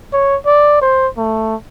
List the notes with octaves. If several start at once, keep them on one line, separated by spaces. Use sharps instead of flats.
C#5
D5
C5
A3